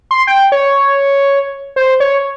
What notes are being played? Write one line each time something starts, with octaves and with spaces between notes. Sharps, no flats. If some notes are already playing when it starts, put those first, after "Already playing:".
C6
G5
C#5
C5
C#5